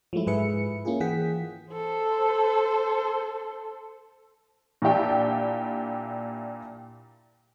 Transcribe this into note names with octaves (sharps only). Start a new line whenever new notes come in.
F3 F#3 G#3 A3 E4
G#2 G#4 B4 E5 C#7
A#3 C#4 E4 F4 G#4
E3 G#4 F#5 G5 B6
A4 C5
A#2 D4 E4 G4 G5